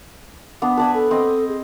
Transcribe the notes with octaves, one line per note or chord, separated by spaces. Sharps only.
B3 D4
B4 D5 G#5 A5
A4
C4 D#5
G#4